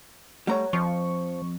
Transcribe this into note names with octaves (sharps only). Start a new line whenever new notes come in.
G3 A3 C#5 F#5 A#5
F2 F3 C#6